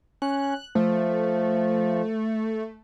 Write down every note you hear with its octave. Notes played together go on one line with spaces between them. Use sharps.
C#4 F#6
F3 A3